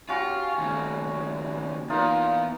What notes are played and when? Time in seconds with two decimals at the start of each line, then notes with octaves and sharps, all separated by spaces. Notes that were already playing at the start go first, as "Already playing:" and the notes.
0.09 G3 C#4 F4 F#4
0.58 D#2 C#3
1.90 E2 A#3 B3 D#4 F4